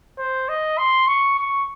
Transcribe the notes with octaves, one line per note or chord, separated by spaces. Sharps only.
C5
D#5
C6
C#6
C#6